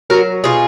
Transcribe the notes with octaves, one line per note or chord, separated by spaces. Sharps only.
F#3 F#4 A#4
B2 F4 G#4